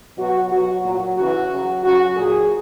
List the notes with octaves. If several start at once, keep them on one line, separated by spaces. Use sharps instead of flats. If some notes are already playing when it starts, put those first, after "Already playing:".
B2 F#3 F#4
B2 F#3 F#4
A#2 F#3
C#3 E3 F#4
C#3 F#3
C#3 F#3 F#4
A#2 F#3 G#4